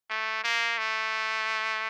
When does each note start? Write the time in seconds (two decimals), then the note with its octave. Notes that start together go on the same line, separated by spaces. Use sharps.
0.10 A3
0.44 A#3
0.78 A3